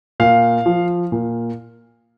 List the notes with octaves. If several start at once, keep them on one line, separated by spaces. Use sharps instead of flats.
A#2 F5
F3
A#2